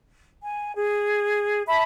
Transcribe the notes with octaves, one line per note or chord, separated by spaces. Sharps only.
G#5
G#4
E5 A5 B5